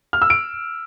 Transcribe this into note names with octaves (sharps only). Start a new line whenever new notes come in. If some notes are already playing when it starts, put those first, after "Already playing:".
F6
E6
D7